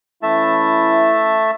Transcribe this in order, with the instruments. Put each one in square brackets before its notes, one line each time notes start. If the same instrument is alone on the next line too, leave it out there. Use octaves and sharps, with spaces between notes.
[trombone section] E3 C#4 E4 [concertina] A3 E5 A5